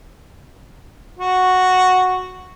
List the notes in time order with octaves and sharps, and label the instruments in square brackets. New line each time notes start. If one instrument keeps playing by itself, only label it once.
[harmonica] F#4